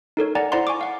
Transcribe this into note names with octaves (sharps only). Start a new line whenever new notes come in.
D#4 A4 A#4 C#5
D5 F#5 G#5 A#5
E4 C5 D5 F#5 A#5 C6
G#5 C#6 D6
F5 F#5